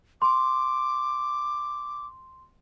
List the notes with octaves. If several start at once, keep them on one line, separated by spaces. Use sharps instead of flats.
C6 D6